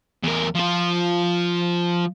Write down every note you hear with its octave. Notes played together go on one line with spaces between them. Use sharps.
E2 A#4
F3 F4